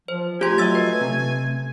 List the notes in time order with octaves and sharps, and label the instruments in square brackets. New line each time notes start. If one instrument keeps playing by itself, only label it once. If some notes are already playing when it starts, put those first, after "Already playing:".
[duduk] F3 [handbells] C5
[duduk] A3 [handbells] F4 C6 [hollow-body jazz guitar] G4 [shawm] G#5
[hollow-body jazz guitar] F#3 D#5 [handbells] E6 A6
[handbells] B4
[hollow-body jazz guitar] C3